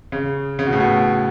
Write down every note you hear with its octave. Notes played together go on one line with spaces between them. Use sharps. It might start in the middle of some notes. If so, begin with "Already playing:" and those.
C#3
C#3
B2
A2
B2